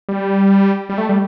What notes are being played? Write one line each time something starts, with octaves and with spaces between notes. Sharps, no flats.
G3
G3
A3
G3